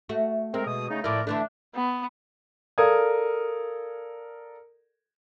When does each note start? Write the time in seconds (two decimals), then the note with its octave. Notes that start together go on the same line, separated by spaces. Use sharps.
0.09 A3 F#4
0.54 G#3 C4 A#4
0.67 B2 D#6
0.90 C#3 A3 D#4
1.04 A2 F3 E4 A#4 D5
1.27 D3 E3 A3 D4
1.74 B3
2.78 A4 A#4 D5 F5 D#6 G#6